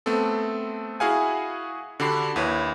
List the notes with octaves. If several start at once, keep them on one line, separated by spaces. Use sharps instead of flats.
A3 B3 C4 A4
E4 F#4 G#4 F5 F#5 G#5
D3 D4 F#4 G4 B5 C7
D#2 E4 B4 C#5